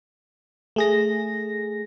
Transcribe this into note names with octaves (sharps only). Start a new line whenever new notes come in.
A3 G#4 A#6